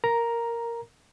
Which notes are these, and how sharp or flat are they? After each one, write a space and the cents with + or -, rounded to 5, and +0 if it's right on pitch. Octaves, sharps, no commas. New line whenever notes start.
A#4 +0 A#5 +5